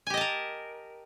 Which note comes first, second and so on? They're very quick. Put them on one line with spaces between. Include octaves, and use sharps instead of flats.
G#5 G4 D#5 A5 A#4